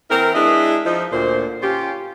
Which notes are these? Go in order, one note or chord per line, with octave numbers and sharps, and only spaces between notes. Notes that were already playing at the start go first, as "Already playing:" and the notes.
E3 C4 E4 A#4
G#3 D4 E4 G#4 B4 D#5
F3 D#4
D2 A#2 C5
C#4 F4 G4